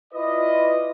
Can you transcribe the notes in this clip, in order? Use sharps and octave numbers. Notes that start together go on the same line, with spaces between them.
E4 F4 B4 D5 D#5